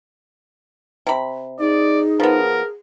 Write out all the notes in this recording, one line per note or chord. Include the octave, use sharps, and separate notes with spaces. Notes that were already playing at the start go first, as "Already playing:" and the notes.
C3 B5
D#4 G#4 D5
F3 B3 A#4